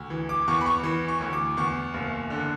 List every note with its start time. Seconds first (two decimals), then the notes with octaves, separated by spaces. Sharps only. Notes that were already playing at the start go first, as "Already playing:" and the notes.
Already playing: D2
0.10 E3
0.29 D6
0.48 E2 C#6
0.61 B5
0.66 C#6
0.83 E3
1.08 C#6
1.21 D2
1.33 D6
1.57 E2 C#6
1.94 F#1
2.30 D3